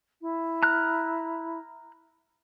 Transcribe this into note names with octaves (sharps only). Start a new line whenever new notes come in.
E4
A#5 F6 F#6